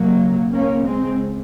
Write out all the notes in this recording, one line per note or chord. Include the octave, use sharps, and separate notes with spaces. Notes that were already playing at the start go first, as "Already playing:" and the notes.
Already playing: C#2 C3 F#3 A#3
C#2 C#3 A#3 C#4
G#3 C4